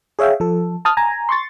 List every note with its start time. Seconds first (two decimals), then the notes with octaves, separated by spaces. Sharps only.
0.19 G#4 C#5 E5 F5 G5
0.40 F3 A4
0.85 A5 D#6 F6
0.97 G#5 A#5
1.29 C6 C#6 A6